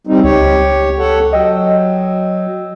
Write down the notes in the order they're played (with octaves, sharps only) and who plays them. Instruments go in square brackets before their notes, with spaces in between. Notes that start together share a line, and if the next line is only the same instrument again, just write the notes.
[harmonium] G3 C4 D#4
[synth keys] C#2 [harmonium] G4 C#5
[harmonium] A4 C#5 F#5
[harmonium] F#3 [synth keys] D#5 G5 E6